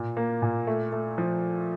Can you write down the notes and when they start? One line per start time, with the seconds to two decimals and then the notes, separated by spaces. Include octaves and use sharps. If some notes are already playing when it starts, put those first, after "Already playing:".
Already playing: A#2
0.17 A#3
0.42 A#2
0.67 A3
0.92 A3
1.18 F3